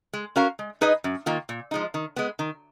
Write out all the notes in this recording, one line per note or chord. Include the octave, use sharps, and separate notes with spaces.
G#3
C#4 F#4 A#4 F5
G#3
D#4 G#4 B4 D#5
F#2
D#3 A#3 F4
A#2
F3 G#3 D#4
D#3
G#3 B3
D#3